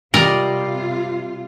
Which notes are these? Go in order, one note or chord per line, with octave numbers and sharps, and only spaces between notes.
C3 G3 F4 A#4 D5 D#5